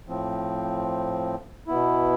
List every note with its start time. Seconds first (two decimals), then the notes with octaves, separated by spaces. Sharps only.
0.07 A2 F3 C4
1.67 B2 B3 E4